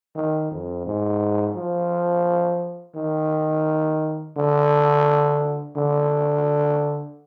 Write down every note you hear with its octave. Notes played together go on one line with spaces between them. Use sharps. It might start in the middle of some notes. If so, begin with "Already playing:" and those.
D#3
F2
G#2
F3
D#3
D3
D3